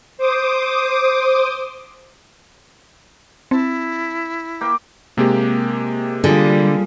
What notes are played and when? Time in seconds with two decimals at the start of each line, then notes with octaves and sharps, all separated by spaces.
0.17 C5 D6 D#6
3.51 C4 E4 A5
4.61 A#3 G5
5.17 C3 G#3 A#3 G4
6.24 D3 G3 F4 G#4